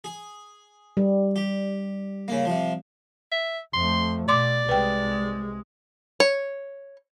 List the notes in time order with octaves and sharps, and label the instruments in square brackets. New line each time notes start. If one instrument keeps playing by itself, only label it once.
[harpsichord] G#4
[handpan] G3
[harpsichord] G4
C#3 A#3
C3 F3
[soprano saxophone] E5
[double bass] F2 A3 [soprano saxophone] C6
[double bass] B2 [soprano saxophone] D5 [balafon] C6 D6
[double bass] C2 G#3 [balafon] B4 G5
[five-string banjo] C#5